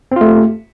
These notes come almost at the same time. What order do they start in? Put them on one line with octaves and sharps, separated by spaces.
C4 F4 A3 G4